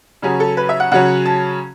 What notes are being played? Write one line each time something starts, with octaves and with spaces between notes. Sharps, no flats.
C#3 F#3 C#4 G#4
A4
B4
E5
F#5
C#3 F#3 C#4 F#5
A5